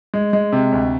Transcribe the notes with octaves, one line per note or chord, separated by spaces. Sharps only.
G#3
G#3
C3
D2